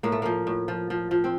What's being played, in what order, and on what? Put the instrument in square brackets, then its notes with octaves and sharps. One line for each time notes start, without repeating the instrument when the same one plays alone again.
[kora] A2 A#3
A3
F3 A#3
A2
F3
F3
F3
C4